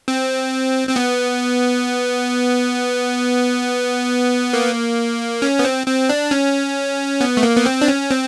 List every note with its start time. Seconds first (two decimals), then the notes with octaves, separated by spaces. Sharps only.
0.08 C4
0.89 C4
0.96 B3
4.53 A#3
5.42 C#4
5.59 B3
5.65 C4
5.87 C4
6.09 D4
6.31 C#4
7.21 B3
7.37 A3
7.43 A#3
7.56 B3
7.66 C4
7.82 D4
7.88 C#4
8.11 C4